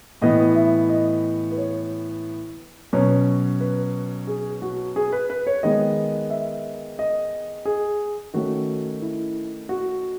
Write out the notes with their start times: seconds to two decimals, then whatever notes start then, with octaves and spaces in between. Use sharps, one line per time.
0.22 A2 E3 B3 D#5
0.56 E5
0.89 D#5
1.52 B4
1.58 C#5
2.93 B2 F#3 C#4
3.61 B4
4.27 G#4
4.62 F#4
4.96 G#4
5.13 B4
5.30 B4
5.47 C#5
5.63 D#3 G#3 B3 D#5
6.30 E5
6.99 D#5
7.65 G#4
8.34 D#3 A3 C#4 F#4
9.02 E4
9.69 F#4